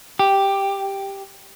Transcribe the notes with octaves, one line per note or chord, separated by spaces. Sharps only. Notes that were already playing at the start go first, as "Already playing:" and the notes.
G4